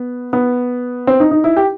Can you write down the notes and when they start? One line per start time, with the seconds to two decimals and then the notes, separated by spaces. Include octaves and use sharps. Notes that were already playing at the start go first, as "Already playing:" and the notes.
Already playing: B3
0.33 B3
1.07 C4
1.20 D#4
1.31 D#4
1.44 E4
1.56 G4